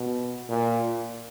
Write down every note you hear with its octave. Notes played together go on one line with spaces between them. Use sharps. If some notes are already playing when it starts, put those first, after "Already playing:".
Already playing: B2
A#2